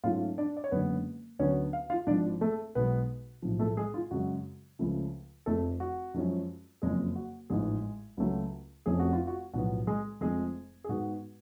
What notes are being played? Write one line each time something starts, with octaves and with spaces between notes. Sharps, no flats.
G#2 F#3 A3 C#4 F4 F5
D4 D5
D5
C#5
F#1 F#2 D3 G#3 B3 C#4 B4
D2 D3 F#3 B3 C#4 C#5
F5
F4 F5
G#1 G#2 F3 D4 D5
A3 A4
B1 B2 G#3 B3 B4
B1 A2 F3
A3 A4
G#3 G#4
F4
F#2 C#3 G#3 F#4
C#2 C#3 F3 A3
F1 F2 F3 A3 A4
F#4
F#2 F3 G#3 C#4
F#1 F2 C#3 F3 G#3 G#4
F#4
A1 G#2 F3 G#3 B3 G#4
C#2 C#3 F#3 A3 C#4
F1 F2 F3 A3 C#4 G#4
F#4
F4
F#4
B1 A2 F3 B3 F#4
G#3 G#4
F1 F2 F3 G#3 A3 G#4
G#4
G#2 G#3 B3 F#4